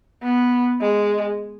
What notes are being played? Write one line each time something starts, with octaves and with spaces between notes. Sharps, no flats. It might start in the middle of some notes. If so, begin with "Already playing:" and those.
B3
G#3